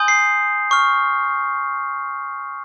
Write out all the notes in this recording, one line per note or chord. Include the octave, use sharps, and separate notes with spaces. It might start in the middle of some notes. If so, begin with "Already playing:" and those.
Already playing: G#5 C6 D#6 G6
C7
C#6 F6